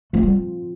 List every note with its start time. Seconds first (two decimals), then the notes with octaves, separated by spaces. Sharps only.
0.13 F3 A3 C4 F4
0.23 G3